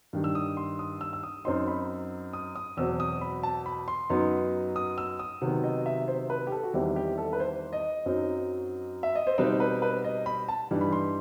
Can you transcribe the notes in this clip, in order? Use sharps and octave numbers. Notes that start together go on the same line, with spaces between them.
G2 D#3 G3
E6
D#6
C6
D#6
E6
E6
D#6
F#2 F#3 C4 D#4 C6
B5
D#6
D#6
E2 B2 F#3 C4 E6
D#6
B5
A5
B5
C6
F#2 F#3 B3 D#4
D#6
E6
D#6
C3 D#3 F#3 B3 F#5
D#5
E5
C5
B4
G4
A4
F#4
E2 D#3 G3 C4 E4 G4
G4
A4
B4
C5
D#5
F#2 F#3 C4 D#4
E5
D#5
C5
B2 G3 C4 D#4 B4
B4
B4
D#5
B5
A5
G2 E3 G3 D#4
B5
C6